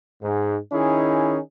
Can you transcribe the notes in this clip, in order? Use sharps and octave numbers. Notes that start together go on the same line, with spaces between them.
G#2
D#3 C#4 D#4 E4 G#4